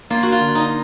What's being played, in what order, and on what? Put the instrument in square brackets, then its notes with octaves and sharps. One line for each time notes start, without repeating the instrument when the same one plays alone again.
[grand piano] A#3 [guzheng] F4
[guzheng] F#4
F4
[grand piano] D3
[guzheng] D#4